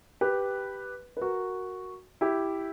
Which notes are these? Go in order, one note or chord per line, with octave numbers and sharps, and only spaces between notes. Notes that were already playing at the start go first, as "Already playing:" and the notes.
G4 B4
B4
F#4 A#4
E4 G4